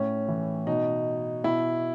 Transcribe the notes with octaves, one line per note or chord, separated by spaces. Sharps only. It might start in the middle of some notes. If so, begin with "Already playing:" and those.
Already playing: A2 C#4
E3
B2 D#4
B2 E4